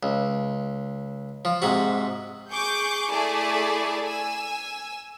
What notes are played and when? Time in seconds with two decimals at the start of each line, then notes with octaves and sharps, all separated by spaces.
0.03 C#2
1.45 F3
1.62 G#2 C3 F#4
2.51 G#4 C#6 D6 G6
3.11 A3 E4 G#4 D5 G#5 A5
4.03 G#5 E6